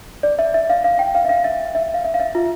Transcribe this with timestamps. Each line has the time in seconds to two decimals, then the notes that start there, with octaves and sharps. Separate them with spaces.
0.23 D5
0.39 E5
0.54 E5
0.70 F5
0.84 F5
0.99 G5
1.15 F5
1.25 E5
1.29 F5
1.44 E5
1.75 E5
1.94 F5
2.04 E5
2.14 F5
2.20 E5
2.35 F4